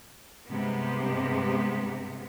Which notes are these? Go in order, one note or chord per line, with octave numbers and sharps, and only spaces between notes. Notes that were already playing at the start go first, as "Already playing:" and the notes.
G2 C3 G#3 B3